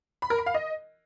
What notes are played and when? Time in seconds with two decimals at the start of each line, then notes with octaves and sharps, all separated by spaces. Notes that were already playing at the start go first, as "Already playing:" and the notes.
0.22 B5
0.30 A#4
0.38 B5
0.46 F5
0.54 D#5